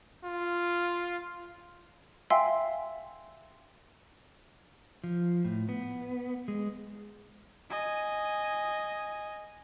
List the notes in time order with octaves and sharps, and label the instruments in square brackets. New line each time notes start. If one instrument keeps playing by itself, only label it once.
[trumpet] F4
[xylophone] E5 F5 G5 G#5 C6 E6
[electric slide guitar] F3
A2
B3
G#3
[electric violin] D#5 G#5